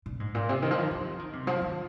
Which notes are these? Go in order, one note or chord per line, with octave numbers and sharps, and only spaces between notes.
A#2
G#2
A#2
C3
D#3
F3
D#3
F3
D#3
C3
F3
D#3